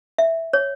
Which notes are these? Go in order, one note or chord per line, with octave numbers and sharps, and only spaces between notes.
E5
C#5